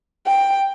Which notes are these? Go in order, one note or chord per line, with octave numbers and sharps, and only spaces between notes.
G5